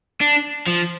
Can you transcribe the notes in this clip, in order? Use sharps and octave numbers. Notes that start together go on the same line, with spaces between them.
D4
F3